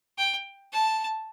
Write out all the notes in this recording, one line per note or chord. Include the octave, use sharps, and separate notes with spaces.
G5
A5